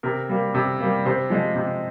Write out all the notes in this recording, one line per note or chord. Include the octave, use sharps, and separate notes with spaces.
C3 A#4
G3 A#3
C3
G3 A#3
C3 C5
F3 G#3
C3